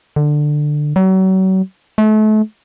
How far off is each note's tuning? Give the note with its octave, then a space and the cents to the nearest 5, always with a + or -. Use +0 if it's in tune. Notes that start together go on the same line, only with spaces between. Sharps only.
D3 +15
F#3 +35
A3 -35